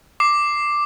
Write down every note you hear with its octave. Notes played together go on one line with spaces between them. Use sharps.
D6 C7